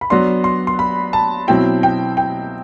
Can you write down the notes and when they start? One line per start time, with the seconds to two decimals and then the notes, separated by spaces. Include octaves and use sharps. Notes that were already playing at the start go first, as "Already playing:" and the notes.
0.01 B5
0.10 F#3 B3 D4 C6
0.44 C6
0.67 C6
0.79 B5
1.13 A5
1.48 B2 F#3 C4 E4 G5
1.83 G5
2.17 G5